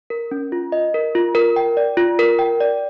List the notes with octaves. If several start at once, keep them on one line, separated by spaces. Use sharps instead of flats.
A#4
C#4
F4
D#5
A#4
F4
A#4
G5
D5
F4
A#4
G5
D5